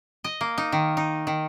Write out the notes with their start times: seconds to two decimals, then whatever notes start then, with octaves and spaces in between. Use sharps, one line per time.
0.24 D#5
0.41 A#3
0.58 D#4
0.72 D#3
0.97 D#4
1.27 D#3